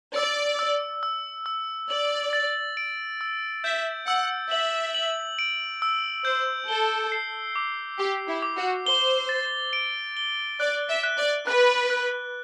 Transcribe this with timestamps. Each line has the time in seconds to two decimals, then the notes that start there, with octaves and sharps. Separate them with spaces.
0.16 D5 E6
0.59 E6
1.03 E6
1.46 E6
1.90 D5 F#7
2.33 A6
2.77 D7
3.21 E6
3.64 E5 G6
4.07 F#5 E6
4.51 E5 F#7
4.95 F#7
5.39 D7
5.82 E6
6.25 C5 G6
6.68 A4 G7
7.12 C7
7.55 D6
7.99 G4 D6
8.28 E4
8.43 D6
8.56 F#4
8.86 C5 G7
9.29 A6
9.73 D7
10.17 G7
10.60 D5 F#6
10.89 E5
11.03 F#6
11.18 D5
11.47 B4 F#6
11.90 F#6